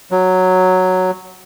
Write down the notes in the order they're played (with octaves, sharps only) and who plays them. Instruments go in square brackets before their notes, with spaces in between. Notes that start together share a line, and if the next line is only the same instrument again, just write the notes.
[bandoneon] F#3